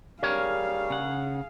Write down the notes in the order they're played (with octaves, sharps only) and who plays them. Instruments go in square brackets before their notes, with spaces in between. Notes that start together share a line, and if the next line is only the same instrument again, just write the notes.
[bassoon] G3 [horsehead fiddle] G#4 F5 [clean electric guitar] A#4 C#5
[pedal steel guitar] C#3 F#5